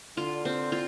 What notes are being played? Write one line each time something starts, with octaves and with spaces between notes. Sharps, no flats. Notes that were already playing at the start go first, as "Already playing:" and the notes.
D3 F4
C4
F4